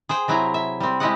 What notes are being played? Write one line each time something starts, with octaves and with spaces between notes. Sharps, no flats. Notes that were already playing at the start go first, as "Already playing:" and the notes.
G#4 C5 G5
C3 F#3 E4 G#5 A#5
E5
G3 C4
G#3 E4 G4 D5 D#5 F#5